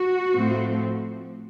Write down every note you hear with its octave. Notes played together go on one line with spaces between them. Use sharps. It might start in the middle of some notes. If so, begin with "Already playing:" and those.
Already playing: F#4
A2 F3 A3 C4